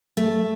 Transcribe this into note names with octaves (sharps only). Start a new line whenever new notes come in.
A3